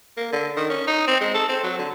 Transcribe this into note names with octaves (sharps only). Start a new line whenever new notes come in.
A#3
D3
D#3
C#4
D#4
C4
G#3
A4
C4
F#3
D3